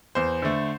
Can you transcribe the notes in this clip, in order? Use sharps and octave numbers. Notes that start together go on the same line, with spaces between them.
E2 C5
D3 A3